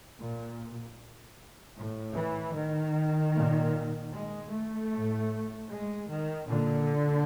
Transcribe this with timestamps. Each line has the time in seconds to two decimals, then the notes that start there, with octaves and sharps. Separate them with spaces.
0.19 A#2
1.77 A2
2.15 E3
2.56 D#3
3.34 A#2
4.13 G#3
4.53 A3
4.92 A2
5.70 G#3
6.09 D#3
6.48 A#2 D3